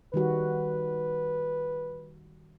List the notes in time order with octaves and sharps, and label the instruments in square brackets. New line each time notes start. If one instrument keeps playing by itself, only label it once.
[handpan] D#3 G3 F#4 [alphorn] B4